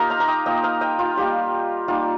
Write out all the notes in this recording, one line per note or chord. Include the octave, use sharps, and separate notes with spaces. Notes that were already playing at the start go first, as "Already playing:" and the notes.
Already playing: A#3 D#4 F4 G4 A#4 D#5
F5 A#5
A#5
D#5 G5
A#3 F4 D#5 G5
F5 A#5
D#5 G5
F4
G3 A#3 F4 G4
G3 A#3 D#4 F4